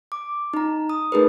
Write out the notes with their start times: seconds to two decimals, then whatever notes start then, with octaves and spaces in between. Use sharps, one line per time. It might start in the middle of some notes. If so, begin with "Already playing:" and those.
0.12 D6
0.54 D#4 A#5
0.89 D#6
1.12 A3 D#4 G#4 A#4 B4